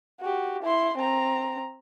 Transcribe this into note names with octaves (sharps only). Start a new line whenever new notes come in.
F#4 G4
E4 C6
C4 A#5